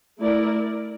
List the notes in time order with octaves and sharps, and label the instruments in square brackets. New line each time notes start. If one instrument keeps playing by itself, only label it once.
[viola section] A3 E4 A#4 D5